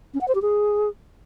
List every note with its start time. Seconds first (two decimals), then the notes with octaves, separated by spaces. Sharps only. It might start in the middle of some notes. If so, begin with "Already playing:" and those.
0.14 C#4
0.21 F#5
0.28 C5
0.35 G4
0.42 G#4